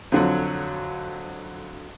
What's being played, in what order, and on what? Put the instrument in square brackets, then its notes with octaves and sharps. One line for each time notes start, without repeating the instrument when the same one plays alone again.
[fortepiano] F2 D3 F#3